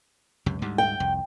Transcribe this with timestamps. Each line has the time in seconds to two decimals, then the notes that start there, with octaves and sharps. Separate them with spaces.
0.46 C#2 F#2 C3
0.62 D2 G#2 G3
0.78 G5
1.00 C2 F2